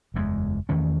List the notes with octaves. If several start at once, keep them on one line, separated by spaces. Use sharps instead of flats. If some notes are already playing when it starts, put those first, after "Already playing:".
F#1 E2 B2 G#3
E2 D#3 A3 C#4